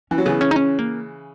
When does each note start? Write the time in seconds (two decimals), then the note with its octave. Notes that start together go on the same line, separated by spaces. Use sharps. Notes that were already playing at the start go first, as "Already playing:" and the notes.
0.11 E3 C#4
0.18 F#3
0.26 C#3 E3 B3
0.41 C#4
0.51 D#4
0.56 C#4
0.79 A#3